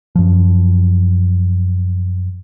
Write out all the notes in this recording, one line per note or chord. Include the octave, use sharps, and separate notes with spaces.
F#2 F3